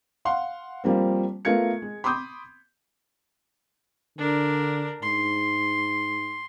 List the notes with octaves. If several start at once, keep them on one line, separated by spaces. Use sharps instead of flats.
F5 F#5 C6
F3 G3 A#3 C4
A3 B3 F4 A#4 G#6 C#7
G#3
B5 C6 D6 D#6 G6
D3 D4 A#4
G#2 C6